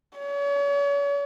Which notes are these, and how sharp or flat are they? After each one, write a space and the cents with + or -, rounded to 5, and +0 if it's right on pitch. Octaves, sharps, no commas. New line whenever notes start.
C#5 +40